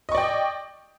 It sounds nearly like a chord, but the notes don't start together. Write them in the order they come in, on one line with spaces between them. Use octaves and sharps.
D#5 C#6 D5 G5